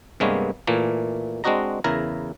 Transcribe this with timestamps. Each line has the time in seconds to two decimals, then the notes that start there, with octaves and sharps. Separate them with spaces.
0.20 G2 C3 G#3 A#3 B3 C#5
0.67 A#2 E3 A3 A#3
1.44 G#3 C4 D4 F#4 D#5 A#5
1.84 E2 C#3 E4 A#4 A#5